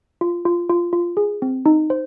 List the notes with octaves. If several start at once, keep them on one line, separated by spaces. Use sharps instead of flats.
F4
F4
F4
F4
G#4
C4
D#4
C5